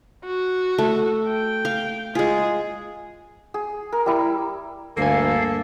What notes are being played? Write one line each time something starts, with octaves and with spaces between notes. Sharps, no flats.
F#4
A3
G5
F5
G#3 F4 G#4
G#4
A#4
G3 E4
D2 G2 A#3 A4 F5 G#5